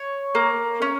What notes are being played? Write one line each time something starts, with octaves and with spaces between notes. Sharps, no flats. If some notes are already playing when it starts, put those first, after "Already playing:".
Already playing: C#5
A#3
C#4